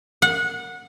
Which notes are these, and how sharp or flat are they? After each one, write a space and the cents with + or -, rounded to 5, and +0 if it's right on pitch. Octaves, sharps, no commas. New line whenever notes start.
F#5 -20